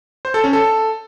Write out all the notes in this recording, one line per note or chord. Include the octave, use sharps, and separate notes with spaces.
C5
A4
C#4
A4